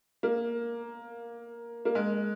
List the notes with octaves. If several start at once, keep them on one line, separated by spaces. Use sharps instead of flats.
A#3
A#3
G#3